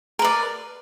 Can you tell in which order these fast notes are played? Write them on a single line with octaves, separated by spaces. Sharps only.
A#4 B4 D5